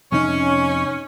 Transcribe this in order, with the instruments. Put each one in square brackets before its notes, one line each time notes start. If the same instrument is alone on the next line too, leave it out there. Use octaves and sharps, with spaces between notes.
[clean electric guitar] F2 C3 D#4 [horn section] C#4